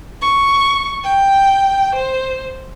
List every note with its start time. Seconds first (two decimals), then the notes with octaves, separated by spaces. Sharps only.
0.22 C#6
1.04 G5
1.95 C5